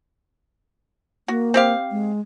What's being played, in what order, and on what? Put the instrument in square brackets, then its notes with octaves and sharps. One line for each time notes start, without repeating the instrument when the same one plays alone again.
[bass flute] A#3 [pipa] F#4
[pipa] C4 G4 F5
[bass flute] G#3